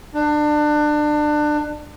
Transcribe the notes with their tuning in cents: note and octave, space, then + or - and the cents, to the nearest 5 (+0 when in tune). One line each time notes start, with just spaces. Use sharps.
D4 +25